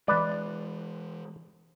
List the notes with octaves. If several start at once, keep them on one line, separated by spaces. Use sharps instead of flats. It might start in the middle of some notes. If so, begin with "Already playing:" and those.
E3 G#3 B4 D5